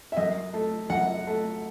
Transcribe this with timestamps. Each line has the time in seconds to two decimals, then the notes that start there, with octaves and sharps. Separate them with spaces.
0.12 E5
0.17 F#2 D#5
0.54 A3
0.90 F#2 F#5
1.27 A3